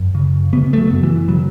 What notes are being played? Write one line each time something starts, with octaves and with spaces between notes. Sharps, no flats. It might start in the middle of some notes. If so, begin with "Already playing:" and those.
Already playing: F#2
C#3
C#3 B3
A3
F#3
F#2
E3
C#3 F#3